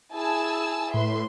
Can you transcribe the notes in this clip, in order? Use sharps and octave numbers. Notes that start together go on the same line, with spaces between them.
E4 G#4 G#5 A5 E6
A2 B4 E5 C6